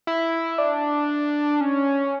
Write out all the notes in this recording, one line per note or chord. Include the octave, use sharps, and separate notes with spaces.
E4
D4
C#4